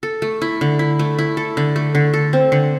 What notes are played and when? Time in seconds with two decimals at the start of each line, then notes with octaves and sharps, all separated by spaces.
0.03 A4
0.22 A3
0.42 E4
0.61 D3
0.79 E4
0.99 A3
1.18 E4
1.37 A4
1.57 D3
1.76 A3
1.95 D3
2.14 A4
2.33 C4
2.52 D3